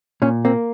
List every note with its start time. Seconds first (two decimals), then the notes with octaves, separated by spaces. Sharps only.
0.22 A#2 C#4
0.45 A#3 C4